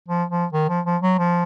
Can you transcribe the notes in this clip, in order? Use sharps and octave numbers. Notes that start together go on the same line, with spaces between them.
F3
F3
D#3
F3
F3
F#3
F3